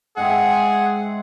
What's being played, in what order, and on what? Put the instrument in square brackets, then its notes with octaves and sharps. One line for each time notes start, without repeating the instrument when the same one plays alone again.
[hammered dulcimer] G#2 C4 E5 [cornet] G#4 [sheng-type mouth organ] F#5